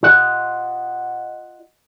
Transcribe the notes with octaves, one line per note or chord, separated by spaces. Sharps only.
F4 D#5 F#5